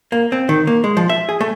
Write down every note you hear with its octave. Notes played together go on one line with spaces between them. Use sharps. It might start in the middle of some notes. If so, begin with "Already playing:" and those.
A#3
C4
D#3
A#3
G#3
F3
E5
G#4
A3